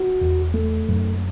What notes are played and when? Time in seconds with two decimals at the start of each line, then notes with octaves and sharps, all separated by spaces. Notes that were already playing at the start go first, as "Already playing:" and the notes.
Already playing: F#4
0.21 E2
0.54 A3
0.89 F#2